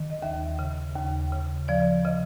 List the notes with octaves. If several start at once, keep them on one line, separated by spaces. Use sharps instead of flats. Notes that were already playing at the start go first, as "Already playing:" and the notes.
Already playing: D#3
D#5
D#2 E5
C#3
D#2
C#3
F3 D5
C#3 D#5